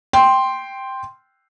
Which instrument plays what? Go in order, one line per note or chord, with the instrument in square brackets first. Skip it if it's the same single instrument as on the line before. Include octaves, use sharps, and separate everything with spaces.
[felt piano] G5 C6